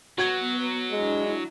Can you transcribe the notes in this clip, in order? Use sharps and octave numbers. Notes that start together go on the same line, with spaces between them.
F#3 B3 F#4 B4 G#6
G#3 D4 E4